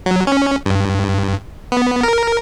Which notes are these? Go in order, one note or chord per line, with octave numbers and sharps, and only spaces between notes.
F#3
C#4
G2
B3
A#4